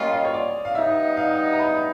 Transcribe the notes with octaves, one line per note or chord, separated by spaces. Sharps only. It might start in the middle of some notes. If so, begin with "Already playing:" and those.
Already playing: G3 A#3 C#4 F4 D#5
D#5
C#5
D5
F5
G3 B3 D#4 E5
F5
A#5
B5